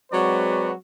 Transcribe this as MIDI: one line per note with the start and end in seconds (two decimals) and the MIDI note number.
0.12 0.72 54
0.12 0.72 56
0.12 0.72 60
0.12 0.72 66
0.12 0.72 71
0.12 0.72 74